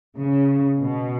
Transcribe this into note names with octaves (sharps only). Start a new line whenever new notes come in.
C#3
B2